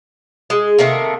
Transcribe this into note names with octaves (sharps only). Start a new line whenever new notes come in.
G#3
C3 D#3 A3 A#3